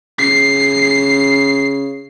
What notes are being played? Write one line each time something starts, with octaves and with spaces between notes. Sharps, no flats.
C#3 C7